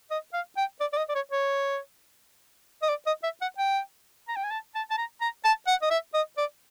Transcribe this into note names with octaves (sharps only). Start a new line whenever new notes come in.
D#5
F5
G5
D5
D5
D#5
D5
C#5
C#5
D#5
D5
D#5
E5
F#5
G5
A#5
G5
G#5
A5
A5
A5
A#5
A#5
A5
F#5
D#5
E5
D#5
D5